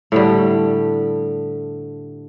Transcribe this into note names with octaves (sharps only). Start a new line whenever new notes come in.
A2 D3 G3